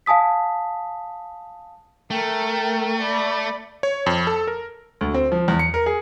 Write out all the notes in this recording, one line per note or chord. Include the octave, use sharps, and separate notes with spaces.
F5 G#5 A5 D#6 B6
A3 A#4 G5
D5 B5
C#5
F2
A4
A#4
D2
C4
F3
E2
C#7
A#4
G#4